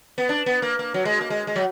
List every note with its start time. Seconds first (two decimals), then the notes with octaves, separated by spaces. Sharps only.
0.18 B3
0.29 D4
0.46 B3
0.62 A#3
0.79 A#3
0.94 F#3
1.05 G#3
1.21 A#3
1.30 G#3
1.47 G#3
1.56 F#3